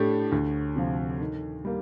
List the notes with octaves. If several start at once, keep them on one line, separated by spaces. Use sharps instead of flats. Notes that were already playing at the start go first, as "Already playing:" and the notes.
Already playing: A2 A3 D4 G4
D2
C3 F3
D#3
G3 A#3